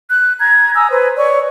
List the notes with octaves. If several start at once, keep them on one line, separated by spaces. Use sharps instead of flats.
F#6
A#5 G#6
G#5 A#5 D#6 E6
B4 C5
C#5 D5 C#6